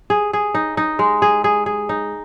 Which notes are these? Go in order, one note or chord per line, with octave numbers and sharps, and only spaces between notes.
G#4
G#4
D#4
D#4
G#3
G#4
G#4
G#4
D#4